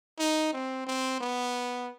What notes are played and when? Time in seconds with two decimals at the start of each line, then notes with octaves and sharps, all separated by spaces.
0.19 D#4
0.53 C4
0.87 C4
1.21 B3